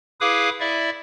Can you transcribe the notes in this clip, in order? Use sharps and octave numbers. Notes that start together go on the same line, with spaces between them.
E4 G#4 B4 F5 D6 D#6
E4 D5 E5